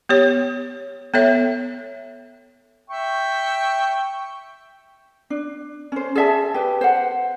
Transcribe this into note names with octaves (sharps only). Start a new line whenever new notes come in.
B3 G4 C#5
B3 A4 C#5 E5
E5 G5 C#6
D4
C#4 C5
G#4 D5 E5 A5
G4 B4
C5 F#5